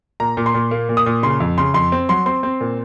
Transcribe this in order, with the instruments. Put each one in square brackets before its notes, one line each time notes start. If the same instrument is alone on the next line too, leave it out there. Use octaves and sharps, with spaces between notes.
[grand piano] A#2 A#5
A#2
C6
A#2
A#3
A#2
D#6
A#2
C#3 C6
F2
C#3 C6
F2 C6
C4
F#3 C6
C4 C6
C4
A#2